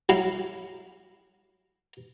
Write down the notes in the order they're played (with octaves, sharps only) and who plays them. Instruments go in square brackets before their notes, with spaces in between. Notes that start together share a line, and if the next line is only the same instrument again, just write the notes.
[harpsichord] F#3 E4 F5